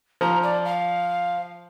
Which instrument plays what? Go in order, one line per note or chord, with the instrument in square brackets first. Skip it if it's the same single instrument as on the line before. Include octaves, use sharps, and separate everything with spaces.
[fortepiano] F3 [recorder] A#5
[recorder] D5
F5